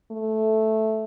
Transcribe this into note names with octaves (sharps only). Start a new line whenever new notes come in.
A3